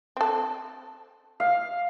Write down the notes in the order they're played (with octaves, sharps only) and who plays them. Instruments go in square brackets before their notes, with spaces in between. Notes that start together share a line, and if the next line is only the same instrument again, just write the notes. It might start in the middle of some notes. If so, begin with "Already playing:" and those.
[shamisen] C4 A4
[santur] F5